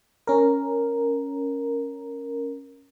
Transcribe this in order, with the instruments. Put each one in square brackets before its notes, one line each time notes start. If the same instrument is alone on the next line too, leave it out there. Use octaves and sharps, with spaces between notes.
[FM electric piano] C#4 A#4